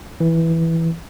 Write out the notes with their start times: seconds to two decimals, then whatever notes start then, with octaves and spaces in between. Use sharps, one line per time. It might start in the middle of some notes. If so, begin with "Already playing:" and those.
0.20 E3